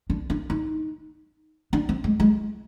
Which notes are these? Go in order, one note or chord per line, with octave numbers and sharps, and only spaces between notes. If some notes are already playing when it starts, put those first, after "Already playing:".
D4
D4
D#4
D4
C4
G#3
G#3